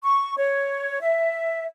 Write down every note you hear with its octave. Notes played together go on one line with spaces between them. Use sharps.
C#6
C#5
E5